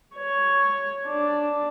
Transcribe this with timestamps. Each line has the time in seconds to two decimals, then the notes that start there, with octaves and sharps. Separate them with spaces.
0.16 C#5
1.07 D4